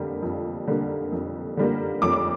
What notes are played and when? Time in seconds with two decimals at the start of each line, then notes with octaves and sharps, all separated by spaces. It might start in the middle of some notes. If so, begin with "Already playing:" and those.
Already playing: F2 D3 G3 A#3
0.22 F2
0.67 D3 G3 A#3
1.12 F2
1.57 D3 G3 A#3
2.02 F2 D6